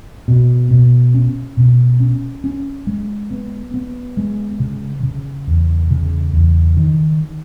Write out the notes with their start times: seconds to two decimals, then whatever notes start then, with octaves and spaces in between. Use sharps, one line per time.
0.28 B2
0.71 B2
1.14 C#4
1.57 B2
2.00 C#4
2.44 C#4
2.87 G#3
3.31 B3
3.74 B3
4.17 G#3
4.60 C#3
5.03 C#3
5.47 E2
5.91 C#3
6.33 E2
6.77 D#3